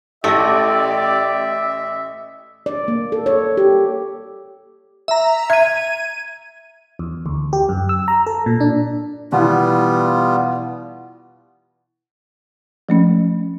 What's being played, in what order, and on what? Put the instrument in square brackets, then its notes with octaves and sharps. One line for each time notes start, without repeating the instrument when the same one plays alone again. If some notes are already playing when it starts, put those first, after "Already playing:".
[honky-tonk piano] A1 A#6 [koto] A3 [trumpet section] G4 D5 [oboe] E5
[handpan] D5
A#3
A4
C#5
G4
[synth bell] E5 A#5
[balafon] E5 [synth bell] G#6 D#7
[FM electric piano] E2
D2
G4
F#2
E6
A#5
A4
A#2
D4
[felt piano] B2 E3 [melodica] G3 B3 F4
[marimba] F3 A3 C#4